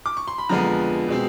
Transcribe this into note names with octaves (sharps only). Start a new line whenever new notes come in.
D6
C#6
C6
B5
F2 D3 F3 G#3 B3 A#5
B2 G#3 C4